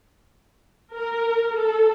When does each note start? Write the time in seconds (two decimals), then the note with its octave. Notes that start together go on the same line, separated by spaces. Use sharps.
0.96 A#4
1.56 A4